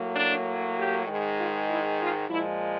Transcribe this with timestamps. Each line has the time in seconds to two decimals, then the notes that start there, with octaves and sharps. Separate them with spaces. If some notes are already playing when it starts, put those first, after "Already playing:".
Already playing: A2 F#3 A#3
0.14 D4
0.76 G4
1.07 G#2 D#3 G#3
1.38 F4
1.68 E4
2.00 F4
2.30 A#2 F3 G#3 E4